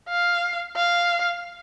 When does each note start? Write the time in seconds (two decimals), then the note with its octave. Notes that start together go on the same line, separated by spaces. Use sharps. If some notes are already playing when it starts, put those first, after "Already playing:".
0.09 F5
0.76 F5